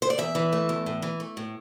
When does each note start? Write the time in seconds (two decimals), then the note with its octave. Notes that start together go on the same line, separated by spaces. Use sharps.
0.02 C5
0.10 D5
0.18 E2 E5
0.35 E3
0.53 A3
0.69 E2
0.86 A2
1.02 E3
1.20 A3
1.37 A2